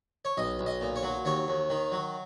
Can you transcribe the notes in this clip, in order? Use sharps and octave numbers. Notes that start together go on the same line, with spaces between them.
C#5
B1 D#5
B1
D#5
A#2
C#5
F#3
D#2 C#5
D#2
D#3
F#3